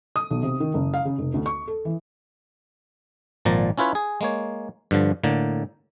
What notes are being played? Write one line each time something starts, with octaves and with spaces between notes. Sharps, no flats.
D#6
B1
C3
D#3
F#1
F5
C#3
F1
D2
C#6
A4
E3
G#1 A#2 F3 D5 A#5
C#4 E4 F4 B4 C#5
G#4
G#3 A#3 C#5
G2 D3 F3
A2 D3 A#3